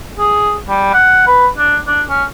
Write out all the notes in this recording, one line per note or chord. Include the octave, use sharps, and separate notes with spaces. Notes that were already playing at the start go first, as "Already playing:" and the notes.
G#4
G3
F#5
B4
D4
D4
C#4